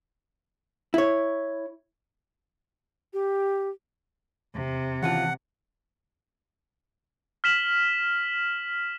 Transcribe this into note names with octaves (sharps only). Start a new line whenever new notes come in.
E4 C#5
G4
E2 C3
D#2 C#3 E3 F4 F#5 A5 F#6
F6 B6 E7 F#7